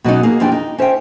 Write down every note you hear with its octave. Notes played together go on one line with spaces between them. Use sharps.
B2 F#3 C#4 D#4
A#3 G#4
F2 E3 D4 G4 G5 G#5
D#4
C#4 C5 E5 G5